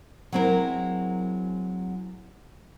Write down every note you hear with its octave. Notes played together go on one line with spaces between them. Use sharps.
F#3 G#3 C4 E4 A#4